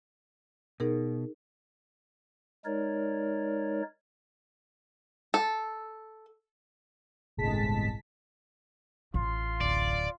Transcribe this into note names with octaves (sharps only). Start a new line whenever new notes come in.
B2 D#4 G#4 A#4
G#3 D#4 A#4 C#5 D5
A4
G1 C2 A2 G#3 A5 B6
A1 F4 C6
D1 D5